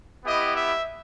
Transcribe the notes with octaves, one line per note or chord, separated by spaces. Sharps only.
B3 E4 G4 D#5
E5